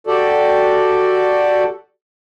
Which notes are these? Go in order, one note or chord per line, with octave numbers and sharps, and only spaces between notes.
F#4 G4 A4 D5